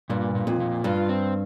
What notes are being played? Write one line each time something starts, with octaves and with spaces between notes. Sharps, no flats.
G2 A#2
A#2
F2
A#2
G2 F4
C4